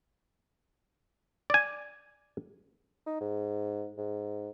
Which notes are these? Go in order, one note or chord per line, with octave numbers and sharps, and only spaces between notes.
D5 G#5
D#4
G#2
G#2